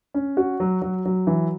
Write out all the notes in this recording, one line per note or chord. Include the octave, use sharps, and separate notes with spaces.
C#4
F#4
F#3
F#3
F#3
E3